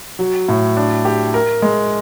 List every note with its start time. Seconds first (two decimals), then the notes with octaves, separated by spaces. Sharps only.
0.19 F#3
0.48 A2
0.77 D4
1.05 G4
1.34 A#4
1.62 G#3